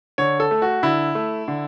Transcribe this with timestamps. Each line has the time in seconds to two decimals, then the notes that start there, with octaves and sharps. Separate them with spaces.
0.18 D3 C#5
0.40 A4
0.51 A3
0.62 F#4
0.83 D3 E4
1.15 A3
1.48 D3